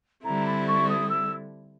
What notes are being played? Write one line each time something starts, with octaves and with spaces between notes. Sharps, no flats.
D3 G3 C4 E4 A4 A#5
B5
C#6
D#6
E6